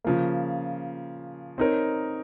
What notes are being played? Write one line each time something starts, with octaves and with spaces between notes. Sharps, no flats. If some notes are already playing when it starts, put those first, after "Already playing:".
C#3 F3 A#3
C4 D#4 A#4 C#5